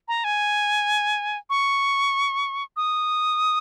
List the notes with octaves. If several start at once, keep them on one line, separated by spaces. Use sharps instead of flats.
A#5
G#5
C#6
D#6